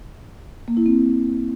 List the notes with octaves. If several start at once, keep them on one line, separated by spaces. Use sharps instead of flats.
A#3
E4
C4